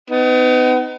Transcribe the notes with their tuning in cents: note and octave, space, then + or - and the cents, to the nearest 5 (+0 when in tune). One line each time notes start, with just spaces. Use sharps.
B3 +35 D#4 +0